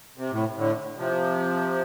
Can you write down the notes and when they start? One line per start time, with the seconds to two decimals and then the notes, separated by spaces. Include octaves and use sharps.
0.17 C3
0.31 A2
0.57 A2 D3
0.97 C3 F3